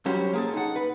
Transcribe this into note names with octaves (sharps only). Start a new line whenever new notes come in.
F#3 G3 C#4 F#4 G4 C5
A#3 G#4 A4
D#4 F#5
B4